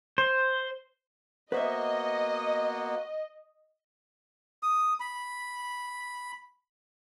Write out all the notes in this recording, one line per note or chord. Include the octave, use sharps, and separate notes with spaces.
C5
A#3 B3 F#4 B4 C5 D#5 E5
D#6
B5